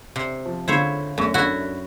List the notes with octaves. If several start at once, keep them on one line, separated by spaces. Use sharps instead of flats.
C3
F3
C#2 D3 E4 C5 C#5
F#2 A3 C#6
D4 E4 F#4 A4